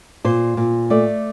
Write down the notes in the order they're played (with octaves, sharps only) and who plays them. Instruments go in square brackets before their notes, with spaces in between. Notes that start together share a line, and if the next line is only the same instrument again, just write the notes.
[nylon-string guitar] A#2 C5
A#2
A3 D5